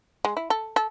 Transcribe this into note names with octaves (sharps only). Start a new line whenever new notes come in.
G#3
E4
A4
A4